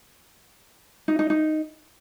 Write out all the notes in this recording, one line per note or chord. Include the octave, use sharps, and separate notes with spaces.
D#4
D#4
D#4